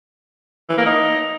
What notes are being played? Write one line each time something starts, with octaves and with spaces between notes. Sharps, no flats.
E3
A#3
D#4